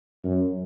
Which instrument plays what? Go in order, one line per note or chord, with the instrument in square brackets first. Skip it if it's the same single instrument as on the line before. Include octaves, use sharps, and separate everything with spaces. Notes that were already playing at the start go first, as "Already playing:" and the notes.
[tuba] F#2